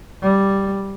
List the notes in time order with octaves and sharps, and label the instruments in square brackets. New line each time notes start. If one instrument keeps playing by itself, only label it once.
[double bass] G3